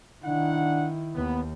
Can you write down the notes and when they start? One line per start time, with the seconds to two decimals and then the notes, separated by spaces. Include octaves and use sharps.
0.24 D#3 D4 E4 F#5
1.15 D#2 B3